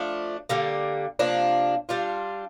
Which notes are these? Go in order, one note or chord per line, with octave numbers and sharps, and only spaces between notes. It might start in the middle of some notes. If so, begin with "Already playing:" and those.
Already playing: F3 A3 D4
D3 G3 A#3
C3 F3 A#3 D4
G3 D4 F4